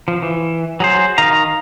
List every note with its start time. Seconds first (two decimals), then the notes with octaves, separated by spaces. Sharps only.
0.08 F3
0.22 E3
0.80 F#3 G#4 C5
1.18 D#3 D#5 F5 A#5